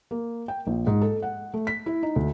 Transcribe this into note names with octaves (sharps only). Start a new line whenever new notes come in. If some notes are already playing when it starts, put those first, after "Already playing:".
A#3
G5
A#1
G#2
A4
F#5
A3
B6
E4
D#4
D2